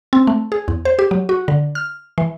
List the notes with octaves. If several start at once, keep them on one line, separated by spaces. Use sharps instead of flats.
C4
A3
G#4
E2
C5
G4
F#3
F#4
D3
F6
E3